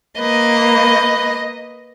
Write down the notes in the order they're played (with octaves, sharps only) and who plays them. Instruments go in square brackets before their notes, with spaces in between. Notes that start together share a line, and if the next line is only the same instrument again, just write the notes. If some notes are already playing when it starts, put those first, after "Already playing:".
[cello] A#3 [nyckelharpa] B4 [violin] D#5